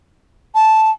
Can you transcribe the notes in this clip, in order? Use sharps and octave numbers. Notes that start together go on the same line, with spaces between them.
A5